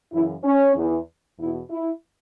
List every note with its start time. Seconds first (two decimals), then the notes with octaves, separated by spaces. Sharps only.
0.13 F#2 C#3 E3 E4
0.43 C#4
0.75 E2 E3
1.38 E2 B2 E4
1.70 E4